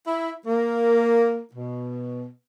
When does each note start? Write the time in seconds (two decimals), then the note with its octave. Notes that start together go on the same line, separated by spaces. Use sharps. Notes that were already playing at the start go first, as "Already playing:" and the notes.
0.07 E4
0.47 A#3
1.54 B2